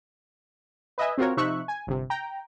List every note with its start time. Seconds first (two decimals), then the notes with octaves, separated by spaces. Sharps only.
0.98 B4 D#5 E5 G#5
1.18 C4 F4 F#4 A#4 C#5
1.37 C3 F3 D#4 E5 C#6 F#6
1.68 G#5
1.87 G1 C3
2.10 G5 A#5